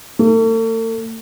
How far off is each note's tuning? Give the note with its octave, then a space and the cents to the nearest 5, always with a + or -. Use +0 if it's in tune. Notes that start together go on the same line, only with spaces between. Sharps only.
A3 +45